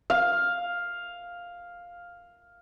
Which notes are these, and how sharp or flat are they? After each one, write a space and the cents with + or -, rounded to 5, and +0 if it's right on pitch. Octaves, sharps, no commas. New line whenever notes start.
F5 +5